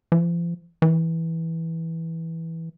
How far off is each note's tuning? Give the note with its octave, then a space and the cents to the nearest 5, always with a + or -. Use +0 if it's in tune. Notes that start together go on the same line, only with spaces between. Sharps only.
F3 -40
E3 -10